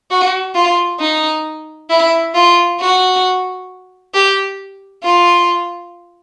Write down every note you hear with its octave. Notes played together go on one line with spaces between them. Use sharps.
F#4
F4
D#4
E4
F4
F#4
G4
F4